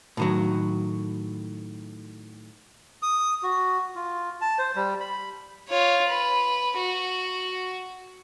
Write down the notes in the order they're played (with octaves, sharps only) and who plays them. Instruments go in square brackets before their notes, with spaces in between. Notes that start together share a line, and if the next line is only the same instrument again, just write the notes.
[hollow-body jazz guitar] A2 D#3 F#3
[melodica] D#6
F#4
F4
A5
C5
G3
B5
[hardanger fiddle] F4 C#5
B4
F#4